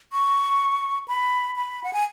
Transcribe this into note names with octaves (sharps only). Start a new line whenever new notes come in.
C#6
B5
B5
F#5
G#5